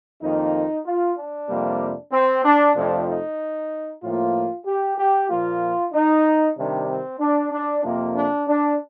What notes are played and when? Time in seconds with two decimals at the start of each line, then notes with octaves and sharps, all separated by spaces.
0.22 F2 D#3 A#3 D#4
0.85 F4
1.17 D4
1.49 F2 C3 G3 A#3
2.12 C4
2.44 D4
2.76 F2 C3 F3 A3 D4
3.07 D#4
4.03 A2 F3 A#3 F4
4.66 G4
4.98 G4
5.30 A#2 F3 A#3 F4
5.93 D#4
6.56 C3 D#3 G3 D4
6.89 C4
7.20 D4
7.52 D4
7.84 F2 C3 F3 A#3
8.15 D4
8.48 D4